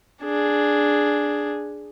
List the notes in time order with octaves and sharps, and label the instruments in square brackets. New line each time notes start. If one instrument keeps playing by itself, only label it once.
[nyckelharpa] D4 G#4